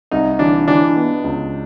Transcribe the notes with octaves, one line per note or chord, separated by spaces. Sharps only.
C2 D#4
E3 D4
E3 D4
B3
C#2